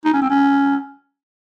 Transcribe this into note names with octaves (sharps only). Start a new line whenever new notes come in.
D#4
C#4
C4
C#4